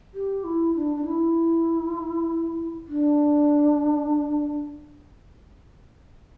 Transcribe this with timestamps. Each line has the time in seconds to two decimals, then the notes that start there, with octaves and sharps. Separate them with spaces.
0.14 G4
0.44 E4
0.76 D4
0.96 D4
1.05 E4
2.88 D4